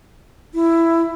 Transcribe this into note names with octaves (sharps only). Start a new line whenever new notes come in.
E4